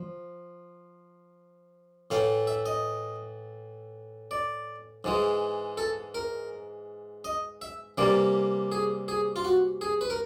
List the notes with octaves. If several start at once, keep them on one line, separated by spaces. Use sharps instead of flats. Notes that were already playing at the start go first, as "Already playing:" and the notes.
Already playing: F3
A2 E3 A3 F5
E5
D#5
D5
G#2 E3 G#3
A4
A#4
D#5
E5
C3 E3 G3 A#3 D5
G#4
G#4
F4
F#4
G#4
B4
A#4